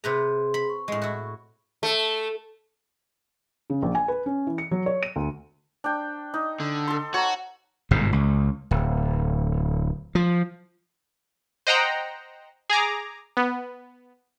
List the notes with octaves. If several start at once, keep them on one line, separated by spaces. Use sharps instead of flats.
C3 G#4 B4 A#5 C6
B5
C#6
A2 G#3
E4 F#4
A3
C#3
A#1
G#5
B4
C#4
E3
C#7
F#3
C#5
D#7
D2
D4 G5
D#4
D3
A4 C6
F#4 C#5 A#5
G1 G#2 B2
C#2
D1
F3
C5 D#5 F#5 G5 A#5
G#4 G#5 A#5 D6
B3